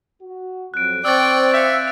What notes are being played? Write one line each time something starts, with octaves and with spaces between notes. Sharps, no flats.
F#4
F2 F#3 F#6 D7
C4 C5 D5 G5 C#6 E6 F#6 A6
E5 F5 G6 C#7